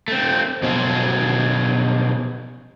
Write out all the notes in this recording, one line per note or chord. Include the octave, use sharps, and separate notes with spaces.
A3 C4
B2 F3 F#3 C#4 C5